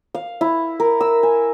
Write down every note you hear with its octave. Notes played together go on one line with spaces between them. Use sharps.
F5
E4
A#4
E6
G#5